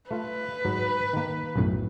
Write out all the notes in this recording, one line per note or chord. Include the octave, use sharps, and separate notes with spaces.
A3 F4 B4
G#2 F#3
D#3 A#3
B1 F#2 A2